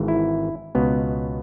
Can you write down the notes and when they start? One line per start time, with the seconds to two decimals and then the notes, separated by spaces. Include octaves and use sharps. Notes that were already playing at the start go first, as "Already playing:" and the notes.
Already playing: G#1 G#2 E3
0.08 E4
0.75 C#2 B2 B3